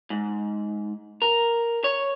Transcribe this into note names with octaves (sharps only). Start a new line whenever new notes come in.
G#2
A#4
C#5